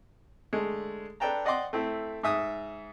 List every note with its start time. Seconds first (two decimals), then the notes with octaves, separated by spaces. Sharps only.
0.53 D3 G#3 A3
1.20 D4 A4 B4 G5 A5 A#5
1.45 D5 D#5 F#5 G5 C6 D6
1.73 A3 C4 E4
2.23 G#2 E5 D#6 E6